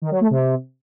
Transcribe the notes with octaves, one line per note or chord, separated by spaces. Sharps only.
D#3
F#3
A3
C3